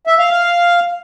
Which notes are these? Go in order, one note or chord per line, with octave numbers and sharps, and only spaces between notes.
E5
F5
F5